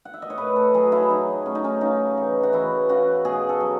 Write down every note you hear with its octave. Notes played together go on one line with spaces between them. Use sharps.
F#5
E5
D#5
C#5
A2 B4
A4
F#3 G#4
E4
F#3 D#4
A2 C#4
D#4
C#4
C#3 D#4
E3
F#4
E3 E4
C#3 F#4
B2 G#4
A4
F#3